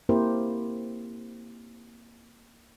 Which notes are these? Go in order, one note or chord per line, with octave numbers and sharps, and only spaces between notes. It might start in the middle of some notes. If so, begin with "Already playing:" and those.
A#3 C4 E4 G4 A#4 C5